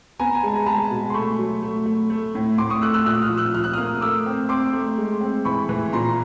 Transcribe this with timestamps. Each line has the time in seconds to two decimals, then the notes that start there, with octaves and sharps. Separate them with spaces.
0.19 B3 G#5 A#5
0.35 G#5
0.43 G#3 A5
0.56 A#5
0.66 G#3 A5 B5
0.91 B2
1.10 C6
1.14 A3 B5 C#6
1.39 F#3
1.62 A3
1.86 A3
2.10 A3
2.35 A2
2.58 A2 C6 D6
2.70 C#6 D#6
2.82 A3 E6 F#6
2.94 E6 F#6
3.06 A#2 E6 F#6
3.22 D#6 F6
3.29 F3
3.37 E6 F#6
3.54 F3 F6
3.64 F#6
3.73 A#3 D#6 F6
4.01 A3 D6 E6
4.26 C4
4.49 C4 C6 D6
4.73 A3
4.98 G#3
5.21 C4
5.45 E3 B5 C#6
5.69 E3
5.93 A#2 A#5 C6